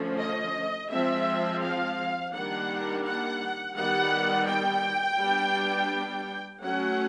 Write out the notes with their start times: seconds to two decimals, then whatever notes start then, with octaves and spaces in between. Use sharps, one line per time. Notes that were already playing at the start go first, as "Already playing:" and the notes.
Already playing: D3 F3 A3 C#4
0.19 D#5
0.90 F3 G#3 C4 E5
1.62 F5
2.34 D#3 G3 A#3 D4 F#5
3.05 F#5
3.76 D#3 G3 B3 F#5
4.47 G5
5.18 G3 B3 D4
6.61 F#3 A3 C#4 F#5